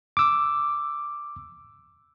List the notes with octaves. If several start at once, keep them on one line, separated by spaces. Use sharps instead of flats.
D6 E6